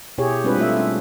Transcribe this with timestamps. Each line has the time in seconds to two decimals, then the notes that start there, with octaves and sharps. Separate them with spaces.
0.18 B2 E4 G4 G#4 C#5
0.44 G3 G#3 C4 D4 F4 B4
0.58 A3 F4 E5
0.80 C#4